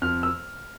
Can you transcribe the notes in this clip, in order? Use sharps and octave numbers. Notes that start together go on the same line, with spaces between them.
F2 F6
E6